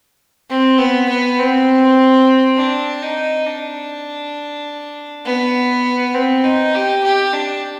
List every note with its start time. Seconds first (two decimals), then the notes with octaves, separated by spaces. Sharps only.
0.50 C4
0.78 B3
1.09 B3
1.39 C4
2.57 D4
3.03 D#4
3.46 D4
5.26 B3
6.15 C4
6.44 D#4
6.75 G4
7.04 G4
7.33 D4